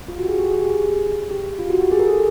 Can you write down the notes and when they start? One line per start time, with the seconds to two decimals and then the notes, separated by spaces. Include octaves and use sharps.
0.08 F4
0.18 F#4
0.23 G4
0.28 G#4
0.34 F#4
0.39 G4
0.50 G#4
0.54 G4
0.65 G4
0.69 G#4
1.31 G4
1.59 F4
1.70 F#4
1.81 G4
1.91 G#4
1.99 A#4
2.08 A4